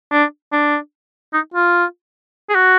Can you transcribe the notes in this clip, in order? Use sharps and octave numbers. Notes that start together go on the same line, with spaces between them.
D4
D4
D#4
F4
G#4
F#4